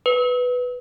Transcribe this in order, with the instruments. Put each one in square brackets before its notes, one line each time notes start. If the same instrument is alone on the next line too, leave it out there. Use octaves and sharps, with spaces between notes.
[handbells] B4